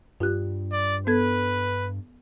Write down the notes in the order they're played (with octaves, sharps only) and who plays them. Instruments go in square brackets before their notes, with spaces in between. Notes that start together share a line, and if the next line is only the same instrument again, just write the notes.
[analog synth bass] G2 [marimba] F4 G4 F#6
[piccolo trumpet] D5
[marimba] B3 A4 G#6 [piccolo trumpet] B4